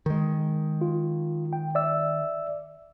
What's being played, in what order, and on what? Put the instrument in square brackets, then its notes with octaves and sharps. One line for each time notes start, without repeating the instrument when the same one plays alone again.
[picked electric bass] D#3 G#3
[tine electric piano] F4
G5
D5 E5 E6